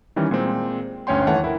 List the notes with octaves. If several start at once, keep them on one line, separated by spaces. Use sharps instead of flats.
D#3 E3 G3 C#4
A#2 G#3 C4
G1 D2 C#4 C#5 G5 C6
D#2 E3 A3 C#5 F#5 A5
E4 A#4